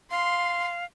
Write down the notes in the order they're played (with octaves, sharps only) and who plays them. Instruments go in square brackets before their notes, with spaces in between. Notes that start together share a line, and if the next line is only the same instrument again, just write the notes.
[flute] F5 [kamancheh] C6